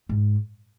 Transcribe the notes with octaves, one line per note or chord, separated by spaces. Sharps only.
G#2